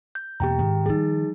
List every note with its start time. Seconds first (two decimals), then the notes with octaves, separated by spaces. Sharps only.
0.15 G6
0.40 E2 B2 A#3 G4 G5 A#5
0.59 G#2 D#3
0.86 F3 G3 D#4 G#4